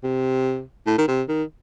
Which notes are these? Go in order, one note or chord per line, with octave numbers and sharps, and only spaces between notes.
C3
A2
D#3
C3
D#3